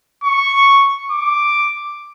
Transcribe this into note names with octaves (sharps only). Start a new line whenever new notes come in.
C#6
D6